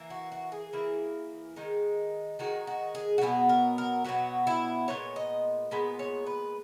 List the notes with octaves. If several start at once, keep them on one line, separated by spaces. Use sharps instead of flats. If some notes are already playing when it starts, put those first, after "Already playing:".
Already playing: E3 A#3
F#4
F#4
G#4
E3 A#3 E4
D#3 G#3 D#4
D#3 G#3 D#4 F#4
F#4
G#4
F#4
B2 F#3 B3 G#4
A#4
A#4
B2 F#3 B3 F#4
E4
A#2 G#3 B3 C#5
D#5
A#2 G#3 B3 B4
C#5
B4